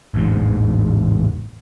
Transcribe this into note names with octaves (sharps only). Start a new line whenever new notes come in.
A1 E2 G#2